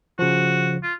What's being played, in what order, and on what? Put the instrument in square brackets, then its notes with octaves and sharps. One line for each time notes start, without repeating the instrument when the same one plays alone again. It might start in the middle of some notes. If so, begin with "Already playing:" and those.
[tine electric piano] C#3 F3 [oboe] F#4
[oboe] F4